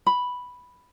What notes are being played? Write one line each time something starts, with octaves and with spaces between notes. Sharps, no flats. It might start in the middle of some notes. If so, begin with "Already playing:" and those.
B5